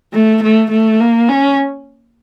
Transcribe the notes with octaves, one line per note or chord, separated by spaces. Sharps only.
A3
A3
A3
A#3
C#4